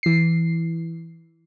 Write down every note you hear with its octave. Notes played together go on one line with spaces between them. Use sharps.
E3 C7